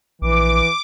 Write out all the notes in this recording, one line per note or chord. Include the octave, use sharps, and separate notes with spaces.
A#1 E3 D6